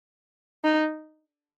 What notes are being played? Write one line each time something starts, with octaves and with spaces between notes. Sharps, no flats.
D#4